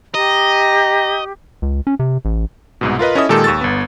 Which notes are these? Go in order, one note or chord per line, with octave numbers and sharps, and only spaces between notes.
G4 D#5 A#5
C#2
C#4
C3
A1
C2 G#2 B2
F4 A#4 B4 D#5
C#4 E4 A4 D#5 E5 D#6
A#2 D#3 G#3 D#4 G4 A4
D#2 C#6 E6 A6
G1 B3